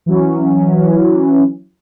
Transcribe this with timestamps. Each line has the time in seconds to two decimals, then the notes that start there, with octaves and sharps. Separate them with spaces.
0.06 E3 F#3 C#4